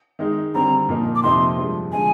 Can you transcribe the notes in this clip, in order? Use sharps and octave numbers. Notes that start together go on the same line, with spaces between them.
D#3 G#3 D#4
D3 G3 C4 A#5
A#2 F3 A#3 D#4
D6
F2 C3 F3 A#3 D#4 C6
G2 F3 G#3
D3 F3 G#3 G#5